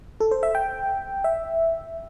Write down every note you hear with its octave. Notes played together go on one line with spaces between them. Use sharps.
A4
C5
E5
G5
E5